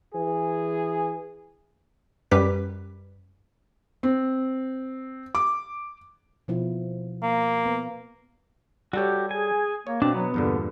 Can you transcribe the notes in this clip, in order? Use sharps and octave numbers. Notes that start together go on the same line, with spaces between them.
E3 G#4
F#2 G3 G4 B4 B6
C4
D6
B2 F3 E4
A#3
B3
G3 F#4 G4 A4 C#5
G#4 G#5
A#3 C#5
B2 C4 D4
F#3 B3
E2 G2 A#2 D3